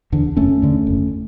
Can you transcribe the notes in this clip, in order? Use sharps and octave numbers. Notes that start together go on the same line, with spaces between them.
E2 D3
F#1 A3 C#4
E2 D3
F#1